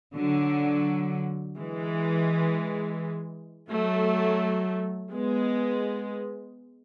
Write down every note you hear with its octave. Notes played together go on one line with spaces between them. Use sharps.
D3 F#3
E3 G#3
F#3 A3
G#3 B3